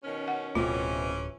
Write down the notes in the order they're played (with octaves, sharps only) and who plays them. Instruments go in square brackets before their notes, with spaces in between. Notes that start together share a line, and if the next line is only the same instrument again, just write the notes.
[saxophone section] B2 D#3 C#4
[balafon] F#5
[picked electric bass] D1 [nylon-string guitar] B2 C4 [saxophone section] E3 A3 C#4 [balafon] F4